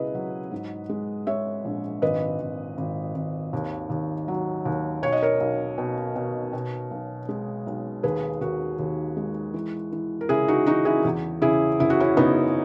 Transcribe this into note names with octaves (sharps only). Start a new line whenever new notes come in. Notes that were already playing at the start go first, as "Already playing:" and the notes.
Already playing: C#2 B2 E4 G#4 B4 D#5
F#3
G#2
G#3
G#3 C#5 E5
A#1
G#1 B4 D#5
G#1
G#1
G#1
D#2
D#2
F#3
D#2
B1 C#5
D#5
A#4 C#5
B1
B2
B2
B2
B1
G#3
B1
D#2 G#4 B4
D#2 F#4 A#4
D#2
G#3
E3
E3
A#4
C#3 E4 G#4
D#4 F#4
E3 D#4 F#4
E4 G#4
E2
C#3 E4 G#4
F#1 E4
F#4
C#4 E4
F#1 B3 D#4